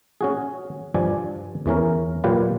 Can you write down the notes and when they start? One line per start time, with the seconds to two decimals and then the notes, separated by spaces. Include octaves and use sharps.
0.21 C#4 F#4 G#4
0.94 G2 F3 D4 D5 G#5
1.66 E2 E3 C#4 A#4
2.24 A#2 F#3 F4 G4 B4 F5